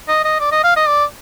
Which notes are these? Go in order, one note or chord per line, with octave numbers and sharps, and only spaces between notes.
D#5
D#5
D5
D#5
F5
D#5
D5